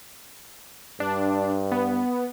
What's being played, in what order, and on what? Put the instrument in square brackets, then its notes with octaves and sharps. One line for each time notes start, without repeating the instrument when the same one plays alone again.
[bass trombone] G2 [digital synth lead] D4
[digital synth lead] B3